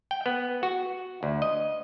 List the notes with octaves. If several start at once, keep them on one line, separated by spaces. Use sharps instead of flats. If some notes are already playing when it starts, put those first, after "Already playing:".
G5
B3
F#4
D2
D#5